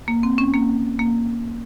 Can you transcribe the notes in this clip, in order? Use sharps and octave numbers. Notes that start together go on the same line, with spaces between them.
A#3
C4
C#4
A#3
A#3